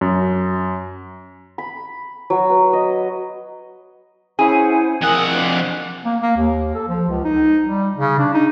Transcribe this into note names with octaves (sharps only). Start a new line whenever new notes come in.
F#2
B5
F#3
B4
D#5
C#4 E4 G#4 C5 F#5 G#5
F2 A#4 F#5 G#5 D#6 E6
D4 C5 F5
A#3
A#3
D#2
A4
F3
C#2
D#4
G3
C#3
D4
D#4